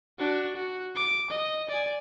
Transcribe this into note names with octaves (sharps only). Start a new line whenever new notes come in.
D4 F#4
F#4
D6
D#5
D5 G#5